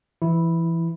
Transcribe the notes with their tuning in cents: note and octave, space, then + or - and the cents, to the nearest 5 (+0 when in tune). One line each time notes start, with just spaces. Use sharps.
E3 +20 E4 -5